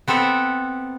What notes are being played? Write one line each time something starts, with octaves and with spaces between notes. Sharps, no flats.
B3 C4 A4 E5 F#5